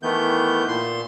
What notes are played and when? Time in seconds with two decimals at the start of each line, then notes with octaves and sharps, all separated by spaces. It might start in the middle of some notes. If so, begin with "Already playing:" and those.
0.03 D#3 E3 A3 B3 G6
0.68 A#2 C6